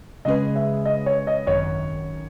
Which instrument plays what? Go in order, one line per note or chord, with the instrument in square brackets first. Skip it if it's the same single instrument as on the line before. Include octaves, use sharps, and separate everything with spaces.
[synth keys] C#3 G#3 C#4 G#4 B4 [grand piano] D#5
[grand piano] E5
D#5
C#5
D#5
[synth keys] G#1 F#2 D#3 [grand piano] C#5